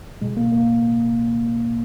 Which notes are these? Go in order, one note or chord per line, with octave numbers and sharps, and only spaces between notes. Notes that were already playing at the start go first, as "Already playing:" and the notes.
B2 G#3
A#3
A#3